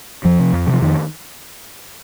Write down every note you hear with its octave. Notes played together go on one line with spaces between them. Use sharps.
F2 F3
C3
F2
C3
F3
F2 D#3